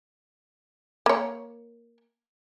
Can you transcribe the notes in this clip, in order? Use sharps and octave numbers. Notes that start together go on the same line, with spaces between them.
A#3 C#5